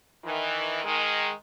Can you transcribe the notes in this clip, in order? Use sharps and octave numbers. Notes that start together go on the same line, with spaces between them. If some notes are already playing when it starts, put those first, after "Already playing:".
D#3 E3
D#3 G#3